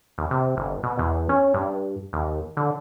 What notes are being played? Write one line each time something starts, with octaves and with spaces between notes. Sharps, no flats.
D#2
C3
G1
B2
E2
C#4
G2
D#2
D3